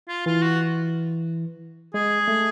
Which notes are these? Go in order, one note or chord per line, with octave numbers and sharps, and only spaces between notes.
F4
E3 F4
F#4
G#3 G#4
A3